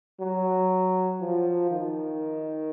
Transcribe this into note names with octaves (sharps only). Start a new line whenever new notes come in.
F#3
F3
D#3